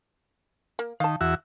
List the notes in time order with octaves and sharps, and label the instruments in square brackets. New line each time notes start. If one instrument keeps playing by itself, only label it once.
[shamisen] A#3
[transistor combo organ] D#3 [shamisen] F5 A5
[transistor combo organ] E2 F#4 E5